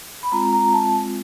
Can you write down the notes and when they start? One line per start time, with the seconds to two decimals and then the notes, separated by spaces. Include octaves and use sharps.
0.23 B5
0.32 G#3 C4 F4 A#5
0.53 A#5
0.73 A5